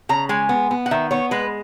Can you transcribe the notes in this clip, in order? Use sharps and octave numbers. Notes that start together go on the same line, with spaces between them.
C#3 A#5
G#3 G#5
B3
B3
F#5
D#3 E5
B3 C#5
G#3 B4